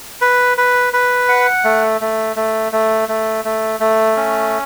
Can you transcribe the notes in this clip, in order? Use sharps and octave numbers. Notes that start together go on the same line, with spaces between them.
B4
B4
B4
F#5
A3
A3
A3
A3
A3
A3
A3
C#4